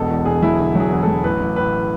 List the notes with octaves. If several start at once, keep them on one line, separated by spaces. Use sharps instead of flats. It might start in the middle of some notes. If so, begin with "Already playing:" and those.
Already playing: E1 B2 A4
E2
E1 G#4
F#3 E4
D3
F#3 G#4
E2
F#3 A4
A1 B4
A1
A2 B4